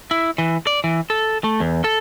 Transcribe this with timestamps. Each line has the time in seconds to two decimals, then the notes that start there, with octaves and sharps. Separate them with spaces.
0.11 E4
0.38 E3
0.67 D5
0.84 E3
1.10 A4
1.44 A3
1.60 E2
1.84 A4